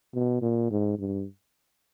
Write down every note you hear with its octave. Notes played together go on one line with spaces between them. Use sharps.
B2
A#2
G#2
G2